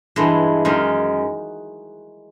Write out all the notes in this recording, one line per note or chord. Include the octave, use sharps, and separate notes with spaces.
G2 E3 G#3
F#2 D#3 G#3